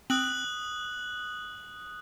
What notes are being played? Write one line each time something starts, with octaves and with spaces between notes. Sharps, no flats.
C4 D#6 F#6 F#7